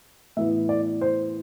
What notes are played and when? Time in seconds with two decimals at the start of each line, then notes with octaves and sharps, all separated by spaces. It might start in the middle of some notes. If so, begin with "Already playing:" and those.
0.37 A2 E3 B3 E5
0.69 D5
1.01 C5